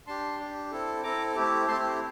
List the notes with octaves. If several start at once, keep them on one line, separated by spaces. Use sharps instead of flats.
D4 G4 A5 C6
D4 G4
C4 E4 A4
C4 E4 A4 A#5 D6
A3 C4 E4 G4
A3 C4 E4 G4 A5 C6